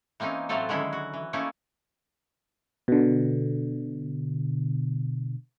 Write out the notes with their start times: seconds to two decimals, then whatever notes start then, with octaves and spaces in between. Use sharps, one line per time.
0.20 E3 A#3 C4 C#4 D#4
0.49 A2 E3 F#3 C4 F4 A4
0.69 D3 D#3 F#3 G#3 C#4 E4
0.93 F#4
1.14 E3
1.33 A3 A#3 C#4 D#4 E4
2.88 B2 D3